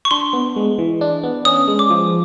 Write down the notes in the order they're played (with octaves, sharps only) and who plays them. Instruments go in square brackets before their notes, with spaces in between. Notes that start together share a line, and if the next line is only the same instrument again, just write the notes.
[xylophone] C#6
[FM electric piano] D4 [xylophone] C6
[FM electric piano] B3
G#3
E3
D4
B3
[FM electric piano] C#4 [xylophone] D#6
[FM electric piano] G#3
[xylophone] D6
[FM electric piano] F3